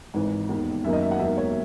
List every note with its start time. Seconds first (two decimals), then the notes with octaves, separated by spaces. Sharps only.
0.14 G#1 G#2 E3
0.49 E1 D#2 D#3
0.84 F#2 D#3 F#3 A#3 E5
0.93 D#5
1.03 E5
1.11 F#5
1.19 E1 D#2 D#3 F#3 A#3 E5
1.38 C#5